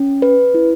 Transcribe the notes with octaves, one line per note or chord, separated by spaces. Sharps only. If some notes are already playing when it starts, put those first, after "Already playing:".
Already playing: C#4
B4
E4